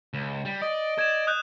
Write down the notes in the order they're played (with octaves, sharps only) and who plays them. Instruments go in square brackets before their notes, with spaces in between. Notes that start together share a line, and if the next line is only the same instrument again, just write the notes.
[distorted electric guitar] C#2
G3
[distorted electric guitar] D5 [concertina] D#5
[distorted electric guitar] D5 [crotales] G#6 E7
[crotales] D#6 F#6 G6